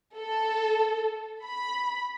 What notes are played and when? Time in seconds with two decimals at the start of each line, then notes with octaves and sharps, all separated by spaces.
0.18 A4
1.45 B5